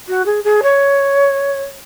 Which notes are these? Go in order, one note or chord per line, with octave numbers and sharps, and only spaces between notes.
F#4
G#4
G#4
C#5